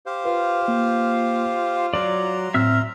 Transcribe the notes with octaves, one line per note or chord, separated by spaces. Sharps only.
G4 C5 F5
F4 B4
A#3
F#3 D5 A#5 C6 D6
A2 C4 E5 E6 F6